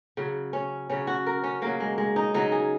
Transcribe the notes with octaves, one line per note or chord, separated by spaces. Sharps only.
C#3 F#3
C#4
C#3 F#3 C#4
F#4
A#4
C#4
C#3 F#3 A#3
G#3
G#3
D#4
C#3 F#3 D#4
G#4